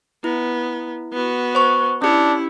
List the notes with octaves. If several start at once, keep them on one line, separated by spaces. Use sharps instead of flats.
B3 E4
B3 F#4
C5 C#6
C#4 D4 E4 G4